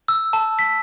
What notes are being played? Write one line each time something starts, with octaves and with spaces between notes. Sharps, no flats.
E6
A5
B6